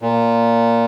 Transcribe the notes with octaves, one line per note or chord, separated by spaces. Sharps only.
A#2